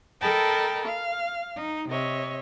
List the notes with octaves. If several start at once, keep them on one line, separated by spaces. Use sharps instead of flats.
A4 A#4 D#5 G5 A5 B5
F5
D#4
C3 C#5 D#5 E5